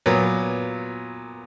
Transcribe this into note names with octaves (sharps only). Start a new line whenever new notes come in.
A#2 F#3 B3